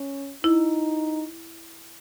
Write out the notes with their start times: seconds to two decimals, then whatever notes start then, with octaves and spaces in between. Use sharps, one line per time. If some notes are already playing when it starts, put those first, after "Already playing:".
Already playing: C#4
0.44 D#4 E4